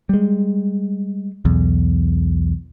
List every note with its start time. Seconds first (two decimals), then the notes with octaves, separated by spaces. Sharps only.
0.09 G3 G#3
1.45 B1 E2